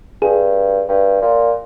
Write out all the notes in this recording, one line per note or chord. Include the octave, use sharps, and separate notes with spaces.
G2 G#4
G2
A#2